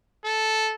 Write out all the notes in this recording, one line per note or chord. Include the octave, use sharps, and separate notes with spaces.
A4